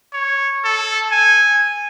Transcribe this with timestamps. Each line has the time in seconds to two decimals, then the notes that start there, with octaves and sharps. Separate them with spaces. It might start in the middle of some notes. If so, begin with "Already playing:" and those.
0.13 C#5
0.65 A4
1.12 G#5